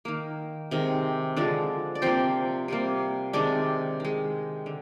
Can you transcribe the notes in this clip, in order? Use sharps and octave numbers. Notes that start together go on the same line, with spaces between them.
D#3 A#3
C3 D#3 G#3
D3 F3 G#3 D4 D5
D5
C3 F3 A#3 C4 C5
C3 G3 A#3
C3 D#3 G#3 D4 D5
D#3 G#3
D3